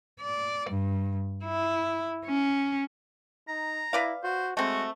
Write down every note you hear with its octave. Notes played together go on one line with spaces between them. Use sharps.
D5
G2
E4
C#4
D#4 A#5
E4 B4 D5 F5
F#4 C5
G#3 A3 C4 F#4